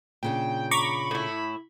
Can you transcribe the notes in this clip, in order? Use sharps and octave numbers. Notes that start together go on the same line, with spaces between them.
A#2 C#3 D4 G5
A#5 B5 C#6 D6
A2 E4